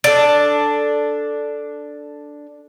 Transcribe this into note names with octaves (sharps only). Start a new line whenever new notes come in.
D4 A4